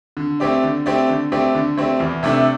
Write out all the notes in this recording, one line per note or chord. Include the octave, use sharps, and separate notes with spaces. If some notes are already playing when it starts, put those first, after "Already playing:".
D3
A3 C4 G4 D5
D3
A3 C4 G4 D5
D3
A3 C4 G4 D5
D3
A3 C4 G4 D5
E2
C3 A3 D4 A4